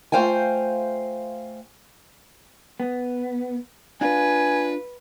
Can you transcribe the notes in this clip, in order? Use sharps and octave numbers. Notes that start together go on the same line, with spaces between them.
A3 F4 C5 F5 G5 G#5
B3
D4 F4 B4 G#5